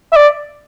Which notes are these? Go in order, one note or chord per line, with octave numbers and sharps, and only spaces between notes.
E5
D5